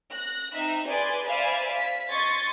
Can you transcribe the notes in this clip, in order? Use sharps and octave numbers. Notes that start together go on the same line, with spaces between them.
F#6 A#6
C4 D#4 E5
G#4 B4 D5 G#5 C6
C5 D5 E5 F5 G#5 B5
B6
D#5 C6 C#6 G#6 A6